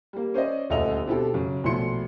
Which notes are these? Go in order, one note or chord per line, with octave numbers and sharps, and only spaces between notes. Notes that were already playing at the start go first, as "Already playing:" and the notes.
G3 A#3
C#4 C5 D5 D#5
D#1 D2 G3 A4 D#5 F7
B2 C4 D4 E4 G4 A4
F#2 C#3
A#1 B2 A3 E4 C6 C#7